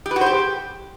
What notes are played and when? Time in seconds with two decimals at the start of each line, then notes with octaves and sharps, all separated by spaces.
0.06 G4
0.11 B4
0.16 F#4
0.21 C5
0.26 G4